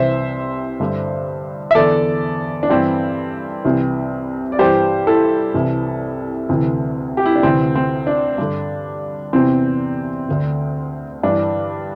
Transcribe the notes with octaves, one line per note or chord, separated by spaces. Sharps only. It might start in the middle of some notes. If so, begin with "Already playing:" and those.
Already playing: C2 C3 E3 C5 E5
G2 D3
E5
E2 D3 A4 D5
D4
G2 E3 C4 E4
C2 C3 E3
D5
G2 E3 G4 C5
E4 A4
C2 C3 E3
D2 C3 E3
G4
E4
D4
D2 C3 E3 C4
C4
D4
G2 D3
E2 C3 E3 C4
D2 D3
G2 E3 D4